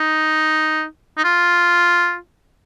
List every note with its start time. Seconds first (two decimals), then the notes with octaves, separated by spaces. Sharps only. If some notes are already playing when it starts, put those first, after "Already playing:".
Already playing: D#4
1.17 D#4
1.24 F4